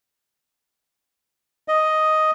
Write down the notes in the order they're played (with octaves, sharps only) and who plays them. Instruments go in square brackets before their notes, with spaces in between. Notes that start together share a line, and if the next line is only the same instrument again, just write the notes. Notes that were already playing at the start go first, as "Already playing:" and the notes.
[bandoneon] D#5